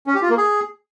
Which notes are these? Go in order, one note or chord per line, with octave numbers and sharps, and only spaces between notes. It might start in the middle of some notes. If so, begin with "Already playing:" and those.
C#4
G4
F4
A#3
G#4